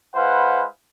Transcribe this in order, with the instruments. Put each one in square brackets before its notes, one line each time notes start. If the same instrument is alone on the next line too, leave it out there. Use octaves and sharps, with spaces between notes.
[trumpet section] G#3 E4 B4 C5 F5 F#5